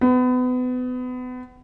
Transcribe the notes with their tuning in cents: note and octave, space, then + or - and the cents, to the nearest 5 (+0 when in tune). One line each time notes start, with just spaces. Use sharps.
B3 +30